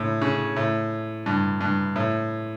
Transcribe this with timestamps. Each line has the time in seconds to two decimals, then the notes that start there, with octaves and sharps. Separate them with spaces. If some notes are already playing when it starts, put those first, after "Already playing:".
Already playing: A2
0.22 C#3
0.56 A2
1.26 G2
1.61 G2
1.96 A2